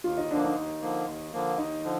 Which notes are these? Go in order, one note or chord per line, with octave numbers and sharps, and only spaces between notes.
D#2 F4
D#4
D3 F3 A#3 D4
D#4
D#2
D3 F3 A#3
D#2
D3 F3 A#3
D#2 D#4
D3 F3